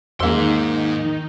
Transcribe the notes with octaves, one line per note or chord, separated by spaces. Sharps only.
E2 G#2 D#3 G#3 A#3 D#4 C6 E6